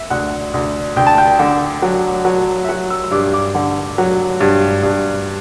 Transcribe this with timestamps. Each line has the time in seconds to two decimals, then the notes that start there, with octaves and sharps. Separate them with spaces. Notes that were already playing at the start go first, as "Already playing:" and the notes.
Already playing: E5
0.10 D2 F#5
0.54 D2
0.96 D2 G5
1.07 A5
1.18 G5
1.39 D3
1.82 F#3
2.25 F#3
2.64 E5
2.69 F#3 F#5
2.90 E6
3.04 E6
3.11 G2 D6
3.34 D6
3.55 D3
3.98 F#3
4.41 G2
4.83 G2